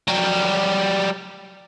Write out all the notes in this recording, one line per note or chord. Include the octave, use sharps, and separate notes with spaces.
F#3 G3